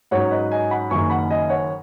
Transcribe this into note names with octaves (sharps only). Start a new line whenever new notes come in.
G#2 F#3 C#4 C#5 F#5
B4 D#5
D#5 G#5
F#5 B5
F#1 F#2 D#3 G#5 C#6
F#5 B5
D#5 G#5
C#5 F#5